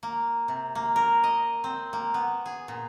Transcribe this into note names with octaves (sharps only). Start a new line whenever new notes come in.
A#3
C3
A#3
A#4
D#5
C4
A#3
B3
G#4
A#2